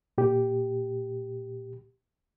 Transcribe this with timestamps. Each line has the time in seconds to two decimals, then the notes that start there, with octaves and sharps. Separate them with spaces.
0.18 A#2 G4